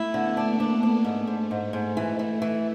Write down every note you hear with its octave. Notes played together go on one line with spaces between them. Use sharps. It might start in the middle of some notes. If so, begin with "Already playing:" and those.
Already playing: A3 E4
D3 B3
D4
A#3
D4
A#3
D4
G#2 A3
G#2
G#2
G#2
E3
E3
E3